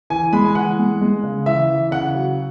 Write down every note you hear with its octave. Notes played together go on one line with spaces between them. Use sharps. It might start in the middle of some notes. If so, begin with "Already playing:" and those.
E3 G#5
G#3 B5
G#5
E3 F#5
G#3
G#3
C#3
E3 E5
E3
C#3 F#5
F#3